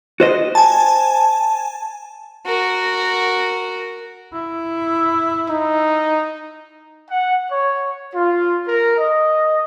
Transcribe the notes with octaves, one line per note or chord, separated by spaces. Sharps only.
F#4 C5 D#5
G#5 A5
F#4 A#4
E4
D#4
F#5
C#5
F4
A#4
D#5